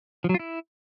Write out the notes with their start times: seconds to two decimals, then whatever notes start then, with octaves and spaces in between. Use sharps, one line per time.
0.24 F3
0.29 F#3
0.34 F4
0.39 E4